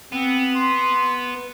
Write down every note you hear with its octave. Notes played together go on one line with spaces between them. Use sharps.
B3 C4
C6